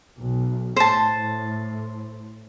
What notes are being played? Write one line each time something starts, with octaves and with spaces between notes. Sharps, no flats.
B1
A2 C5 A5